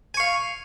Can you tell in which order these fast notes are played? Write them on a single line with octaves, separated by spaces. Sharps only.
G#5 C#6 F5